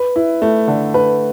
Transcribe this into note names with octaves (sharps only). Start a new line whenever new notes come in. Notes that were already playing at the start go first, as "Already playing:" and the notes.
Already playing: B4
E4
A3
D3
B4